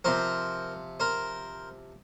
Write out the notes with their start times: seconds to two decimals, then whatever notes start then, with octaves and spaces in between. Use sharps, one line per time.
0.04 C3 F3 A#4 C5
1.00 A#4 C5